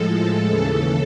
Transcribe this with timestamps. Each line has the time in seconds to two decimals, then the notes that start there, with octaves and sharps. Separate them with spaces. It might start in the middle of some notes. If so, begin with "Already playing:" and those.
Already playing: A2 F3 G#3 A4
0.46 D#2 C#3 E3